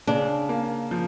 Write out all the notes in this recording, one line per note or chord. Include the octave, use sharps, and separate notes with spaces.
C#3 D4
A#3
F3